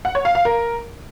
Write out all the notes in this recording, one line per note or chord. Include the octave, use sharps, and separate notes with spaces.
F#5
C#5
F5
F5
A#4